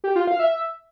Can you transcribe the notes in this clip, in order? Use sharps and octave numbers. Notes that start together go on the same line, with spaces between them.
G4
F4
F5
E5